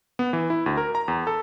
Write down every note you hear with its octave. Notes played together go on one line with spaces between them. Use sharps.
B3
E3
E4
D2
A#4
A#5
E2
A4